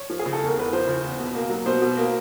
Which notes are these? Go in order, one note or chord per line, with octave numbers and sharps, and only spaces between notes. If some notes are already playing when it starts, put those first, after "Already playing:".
Already playing: C#5
F3
G#4
C#3
A4
E2 A#4
E2 B4
F3 C5
C#3
E2
B2
A#3
F#3
B2 C5
B2
A#3